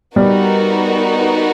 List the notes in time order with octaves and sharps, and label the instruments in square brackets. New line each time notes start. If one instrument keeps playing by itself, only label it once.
[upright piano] G3 [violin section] B3 D#4 F#4 A#4